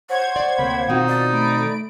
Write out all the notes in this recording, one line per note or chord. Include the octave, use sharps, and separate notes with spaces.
C5 C#5 F#5 G#6
D5
D2 C3 A#3 B5
B2 D#3 C4 D#4 F4 F#4
D5
A3 B5 D7